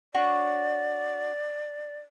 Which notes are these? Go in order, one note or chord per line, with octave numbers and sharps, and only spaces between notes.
D4 F#4 C#5 D5